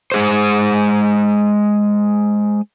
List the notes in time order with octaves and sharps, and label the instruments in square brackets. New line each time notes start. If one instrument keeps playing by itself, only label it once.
[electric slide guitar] G#3 G#4 C5